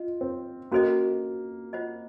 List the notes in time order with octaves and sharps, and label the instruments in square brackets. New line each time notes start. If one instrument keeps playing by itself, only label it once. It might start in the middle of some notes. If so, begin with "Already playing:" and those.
Already playing: [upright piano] F4 [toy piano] D#5
[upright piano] C4
[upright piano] A#3 [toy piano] C#4 F#4 A4 C5 D#5
[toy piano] F4 C5 D#5 F#5